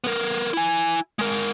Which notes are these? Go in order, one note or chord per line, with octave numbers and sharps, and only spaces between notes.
B3 A#4
E4 G#5
G#3 A#4